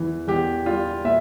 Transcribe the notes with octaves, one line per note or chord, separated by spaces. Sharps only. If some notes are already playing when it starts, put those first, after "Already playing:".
Already playing: E2 E3
E2 G4
G3 F4
A#2 E5